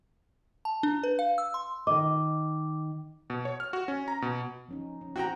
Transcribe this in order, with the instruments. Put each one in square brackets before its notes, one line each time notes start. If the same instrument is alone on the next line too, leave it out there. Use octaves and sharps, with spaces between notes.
[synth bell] A5
D4
B4
F5
E6
C6
[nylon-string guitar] D#3 D#5 [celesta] D6
[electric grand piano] B2
C#5
F6
F#4
C#4
A#5
B2
[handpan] F3 C#4 D#4
C#4
[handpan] C4 [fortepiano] F#4 G5 A#5